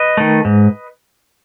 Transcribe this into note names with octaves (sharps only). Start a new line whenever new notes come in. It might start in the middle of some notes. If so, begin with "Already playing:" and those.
Already playing: B4 D#5
D#3 A3
G#2